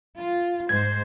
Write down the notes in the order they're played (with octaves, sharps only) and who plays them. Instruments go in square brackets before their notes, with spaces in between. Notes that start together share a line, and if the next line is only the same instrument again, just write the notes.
[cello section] F4
[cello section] G#2 C5 [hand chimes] G#6